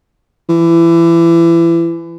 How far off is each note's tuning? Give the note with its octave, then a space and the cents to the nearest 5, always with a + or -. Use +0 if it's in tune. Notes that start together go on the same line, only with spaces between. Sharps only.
E3 +25